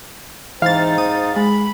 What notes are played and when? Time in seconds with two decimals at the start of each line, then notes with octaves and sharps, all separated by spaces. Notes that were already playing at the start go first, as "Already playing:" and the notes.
0.62 G#2 E3 C4 D#4 F5 A6
0.98 D#6
1.36 G#3 B5